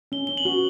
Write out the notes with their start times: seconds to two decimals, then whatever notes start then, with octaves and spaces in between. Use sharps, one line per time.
0.12 C#4 G7
0.27 C#4 G7
0.37 F#7
0.45 F#4